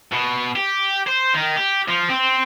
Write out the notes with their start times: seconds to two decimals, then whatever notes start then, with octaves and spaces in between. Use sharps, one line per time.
0.13 B2
0.56 G4
1.07 C5
1.34 D#3
1.56 G4
1.88 F3
2.09 C4